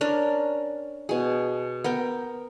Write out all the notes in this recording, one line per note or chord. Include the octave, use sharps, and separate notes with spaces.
C#4 D4 A#4
B2 G#4
B3 A#4 G5